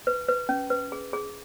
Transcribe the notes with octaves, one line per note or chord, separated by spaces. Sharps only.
B4
B4
C#4
B4
G#4
G#4